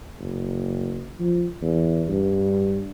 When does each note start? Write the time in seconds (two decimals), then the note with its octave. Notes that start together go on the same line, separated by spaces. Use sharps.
0.19 F#1
1.19 F3
1.61 E2
2.08 G2